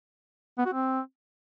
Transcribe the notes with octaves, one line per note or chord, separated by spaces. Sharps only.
B3
F#4
C4